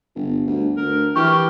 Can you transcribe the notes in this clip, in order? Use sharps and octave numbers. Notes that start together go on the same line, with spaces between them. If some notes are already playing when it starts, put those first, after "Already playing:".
G1
D2
D2 A#4
E3 G4 C#6 F6